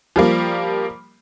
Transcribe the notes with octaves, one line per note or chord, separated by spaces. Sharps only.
F3 G3 A#3